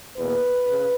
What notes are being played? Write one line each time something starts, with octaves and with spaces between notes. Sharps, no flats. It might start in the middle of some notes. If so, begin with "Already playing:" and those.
E2 B2 A#3 B4
C#3